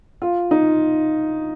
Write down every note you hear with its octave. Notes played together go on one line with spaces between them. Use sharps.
F4
D#4